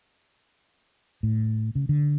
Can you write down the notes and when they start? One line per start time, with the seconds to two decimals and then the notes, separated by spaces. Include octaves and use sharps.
1.23 A2
1.75 C#3
1.89 D3